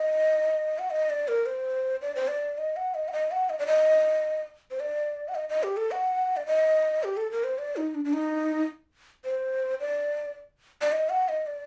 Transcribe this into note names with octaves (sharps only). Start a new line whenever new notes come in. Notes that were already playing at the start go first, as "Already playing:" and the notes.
Already playing: D#5
F#5
D#5
D5
A#4
C5
D5
C5
D5
D#5
F#5
D#5
F#5
D#5
F#5
D#5
D5
D#5
C5
D5
F#5
D#5
D#5
G4
A4
F#5
D5
D#5
G4
A4
A#4
C5
D5
D#4
D4
D4
D#4
C5
D5
D5
D#5
F#5
D#5
D5